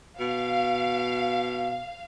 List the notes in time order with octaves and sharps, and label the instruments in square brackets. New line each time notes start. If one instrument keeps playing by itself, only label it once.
[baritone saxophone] B2 [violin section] F5